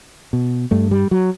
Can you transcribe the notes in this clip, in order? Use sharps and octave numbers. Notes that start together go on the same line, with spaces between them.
B2
G2 A3
G3
F#3